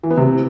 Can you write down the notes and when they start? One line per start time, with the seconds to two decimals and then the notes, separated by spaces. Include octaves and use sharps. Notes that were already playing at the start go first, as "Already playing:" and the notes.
0.03 E3
0.10 B3
0.17 C3